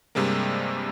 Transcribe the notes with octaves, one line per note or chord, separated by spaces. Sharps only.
G2 C3 G3 G#3 A#3